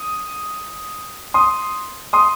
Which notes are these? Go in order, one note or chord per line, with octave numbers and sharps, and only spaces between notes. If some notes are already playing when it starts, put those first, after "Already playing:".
Already playing: D#6
C6 D#6
C6 D#6